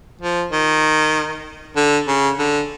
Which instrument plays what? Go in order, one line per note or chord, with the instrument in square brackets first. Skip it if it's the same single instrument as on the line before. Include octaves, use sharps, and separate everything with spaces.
[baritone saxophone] F3
D#3
D3
C#3
D3